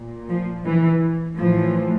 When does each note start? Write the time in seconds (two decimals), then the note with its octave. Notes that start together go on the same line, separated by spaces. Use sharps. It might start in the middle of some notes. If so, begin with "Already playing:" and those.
Already playing: A#2
0.29 F3
0.66 E3
1.38 A2 E3 F3